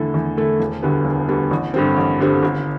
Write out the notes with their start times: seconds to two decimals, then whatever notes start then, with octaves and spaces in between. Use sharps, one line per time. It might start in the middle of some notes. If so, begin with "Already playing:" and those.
Already playing: E2 D3 A3 E4 A4
0.14 E2
0.37 D3 A3 E4 A4
0.60 E1
0.82 D2 D3 G3 B3
1.05 E1
1.28 D2 D3 G3 B3
1.51 A1
1.74 G2 D3 G3 C4
1.97 A1
2.20 G2 D3 G3 C4
2.43 G1